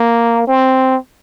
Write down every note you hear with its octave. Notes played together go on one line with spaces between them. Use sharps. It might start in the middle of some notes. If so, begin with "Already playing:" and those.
Already playing: A#3
C4